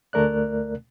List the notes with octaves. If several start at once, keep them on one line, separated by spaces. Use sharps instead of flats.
D2 A3 A#4 D5 F#6